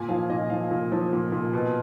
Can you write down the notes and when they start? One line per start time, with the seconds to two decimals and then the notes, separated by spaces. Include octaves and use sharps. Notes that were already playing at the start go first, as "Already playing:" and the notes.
Already playing: A#2 G#5
0.09 F3 F5
0.30 A#2 D#5
0.50 F3 F5
0.71 A#2
0.92 F3
1.13 A#2
1.32 A#2
1.53 B2